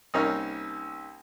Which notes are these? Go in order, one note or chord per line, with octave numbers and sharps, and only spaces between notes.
C2 A#3 C#4 D#4 C#5 F6